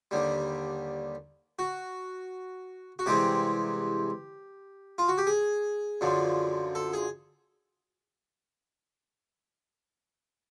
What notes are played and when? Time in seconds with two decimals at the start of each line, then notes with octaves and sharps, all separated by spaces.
0.11 D#2 D3 G3
1.59 F#4
2.99 F#4
3.06 C2 C3 E3 G#3 C4 G4
4.98 F4
5.08 F#4
5.18 G4
5.27 G#4
6.01 F#2 D3 F3
6.75 A4
6.93 G#4